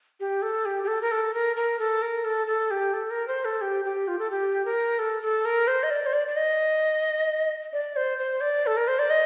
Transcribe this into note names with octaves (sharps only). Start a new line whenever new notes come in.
G4
A4
G4
G4
A4
A#4
A4
A#4
A#4
A4
A#4
A4
A4
G4
A4
A#4
C5
A4
G4
G4
F4
A4
G4
A#4
A4
A4
A#4
C5
D#5
D5
C5
D5
D5
D#5
D5
C5
C5
D5
A4
A#4
C5
D5
D#5